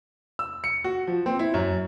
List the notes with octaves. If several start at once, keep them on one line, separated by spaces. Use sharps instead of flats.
E6
C#7
F#4
F3
C4
E4
F#2